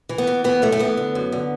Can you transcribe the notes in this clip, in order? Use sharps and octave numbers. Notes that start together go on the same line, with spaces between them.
E3
B3
E3
E3 B3
F#2 A3
A3
E3 B3
D3
F#2
D3